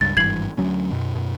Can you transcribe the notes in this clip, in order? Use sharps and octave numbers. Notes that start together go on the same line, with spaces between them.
C#2 G2 A6
G#1 G2 E3 G#6 C7 F#7
D2 F#3 C#4
F#2 B2
F#2 B2